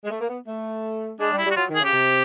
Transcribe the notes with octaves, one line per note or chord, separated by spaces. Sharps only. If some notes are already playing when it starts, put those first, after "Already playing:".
G#3
A3
A#3
B3
A3
G#3 D4
G3
E4
G3
F#4
F#3 F4
D#3
G#4
C#3 G4
C3